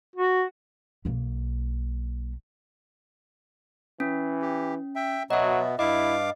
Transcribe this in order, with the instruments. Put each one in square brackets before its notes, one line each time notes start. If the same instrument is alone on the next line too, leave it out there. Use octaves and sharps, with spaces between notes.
[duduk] F#4
[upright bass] B1 A#3
[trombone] E3 [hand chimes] C#4
[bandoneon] G4
E5 G5
[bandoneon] B2 B3 [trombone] F#3 [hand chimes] D#5 E5
[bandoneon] G2 F5 D6 [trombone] E4 [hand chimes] D#5